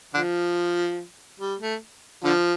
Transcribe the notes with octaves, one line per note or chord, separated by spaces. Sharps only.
D3 F3
G3
A3
D3 F3